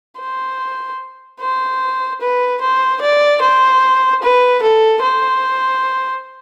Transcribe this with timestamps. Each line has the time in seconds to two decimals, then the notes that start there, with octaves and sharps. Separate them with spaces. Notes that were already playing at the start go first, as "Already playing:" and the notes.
0.20 C5
1.40 C5
2.21 B4
2.61 C5
3.01 D5
3.41 C5
4.22 B4
4.62 A4
5.02 C5